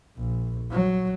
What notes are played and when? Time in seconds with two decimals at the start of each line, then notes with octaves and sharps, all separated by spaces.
0.17 A#1
0.71 F#3